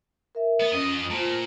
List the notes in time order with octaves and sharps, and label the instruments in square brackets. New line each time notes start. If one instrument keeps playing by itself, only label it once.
[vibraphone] A#4 E5
[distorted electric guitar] B3
[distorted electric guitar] F2 D#5 [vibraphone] C#4
[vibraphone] G#5
[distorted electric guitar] A#2 [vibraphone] F4 C5 A5